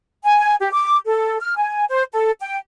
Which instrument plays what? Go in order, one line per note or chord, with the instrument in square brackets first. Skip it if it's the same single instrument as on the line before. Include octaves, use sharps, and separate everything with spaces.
[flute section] G#5
G4
D6
A4
F6
G#5
C5
A4
G5